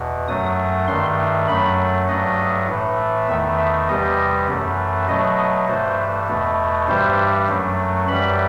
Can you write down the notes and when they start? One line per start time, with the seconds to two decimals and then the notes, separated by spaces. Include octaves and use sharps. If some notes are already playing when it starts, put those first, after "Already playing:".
Already playing: E2 B2
0.28 F#2 F#3 A3 D#6
0.87 G2 D#3 A3 C6
1.48 F#2 F#3 A3 B5
2.08 G2 F#3 A3 D#5
2.68 A2 E3 A3
3.28 E2 D#3 A3 E5
3.58 E5
3.88 E2 C3 E3 G3 D#5
4.48 F#2 E3 A3
5.08 B2 F#3 A3 D#5
5.39 D#5
5.68 G2 E3 A3 C5
6.28 E2 B2 A3
6.88 G2 E3 G3 C5
7.48 F#2 F#3 A3
8.08 F#2 E3 G3 B5